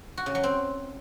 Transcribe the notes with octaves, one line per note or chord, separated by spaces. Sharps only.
F#4
C#3
F#3
C4